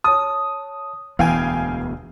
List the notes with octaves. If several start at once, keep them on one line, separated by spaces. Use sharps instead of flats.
C#5 A5 D#6
E1 D2 E3 B3 F5 G5 G#5